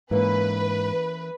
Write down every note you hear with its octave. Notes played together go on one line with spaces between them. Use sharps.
G#2 E3 A#3 C#4 B4